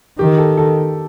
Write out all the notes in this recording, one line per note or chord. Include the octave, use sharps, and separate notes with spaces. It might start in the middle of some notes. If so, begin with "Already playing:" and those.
D#3 G4
A4
A4